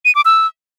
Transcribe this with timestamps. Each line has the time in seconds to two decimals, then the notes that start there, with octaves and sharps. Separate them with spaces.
0.05 D#7
0.15 D6
0.25 E6